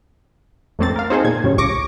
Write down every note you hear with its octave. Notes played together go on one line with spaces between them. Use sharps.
F2 A2 A3 A#3 C4 A6
A#4 F5
C4 D#4 G#4 A4 C5
A#2 G#6
F#2 A2 C#3 G3
C#2 C#6 D6 A#6